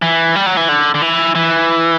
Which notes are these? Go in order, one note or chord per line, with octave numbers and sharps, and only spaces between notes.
E3
G3
F#3
E3
D3
D3
E3
E3